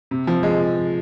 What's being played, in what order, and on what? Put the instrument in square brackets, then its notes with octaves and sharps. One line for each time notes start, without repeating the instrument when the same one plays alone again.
[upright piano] C3
F3
G#3